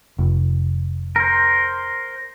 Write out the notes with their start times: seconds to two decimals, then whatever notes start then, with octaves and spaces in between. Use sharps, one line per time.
0.19 F1
1.16 A#4 C5